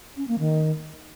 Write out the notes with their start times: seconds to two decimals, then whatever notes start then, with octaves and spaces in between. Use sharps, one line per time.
0.17 C#4
0.28 A#3
0.39 D#3